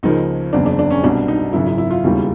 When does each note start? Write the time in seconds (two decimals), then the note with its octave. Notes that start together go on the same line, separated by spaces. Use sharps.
0.03 C#2 C#3 F3 A#3 D#4
0.53 F#1 E2 C#3 D4
0.66 D4
0.79 D4
0.91 C#4
1.03 C2 B2 G3 D4
1.28 D#4
1.53 G#1 F#2 C#3 E4
1.67 E4
1.78 E4
1.91 F4
2.04 E1 D#2 C#3 E3 G3